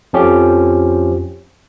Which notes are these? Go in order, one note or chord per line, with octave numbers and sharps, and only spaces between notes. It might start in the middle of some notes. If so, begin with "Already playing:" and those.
F2 F3 C#4 G4